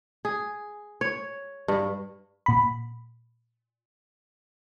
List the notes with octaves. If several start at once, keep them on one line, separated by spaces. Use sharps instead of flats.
G#4
C#5
G2
A#2 B5